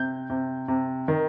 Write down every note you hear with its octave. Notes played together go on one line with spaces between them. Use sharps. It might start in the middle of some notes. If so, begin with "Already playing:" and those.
Already playing: C3 G6
C3
C3
D#3